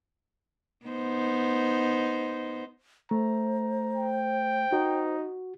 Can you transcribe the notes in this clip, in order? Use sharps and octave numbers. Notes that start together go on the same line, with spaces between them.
B3 D#4 C5
A3 C5 A#5
G5
D#4 F#4